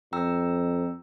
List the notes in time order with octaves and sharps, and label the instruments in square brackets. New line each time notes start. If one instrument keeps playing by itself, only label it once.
[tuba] F2 [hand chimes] G5 A#5 E6